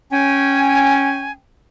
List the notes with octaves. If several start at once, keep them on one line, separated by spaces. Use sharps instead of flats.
C#4 G5 G#5